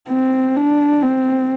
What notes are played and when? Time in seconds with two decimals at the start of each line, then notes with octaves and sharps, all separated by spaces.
0.09 C4
0.56 D4
1.02 C4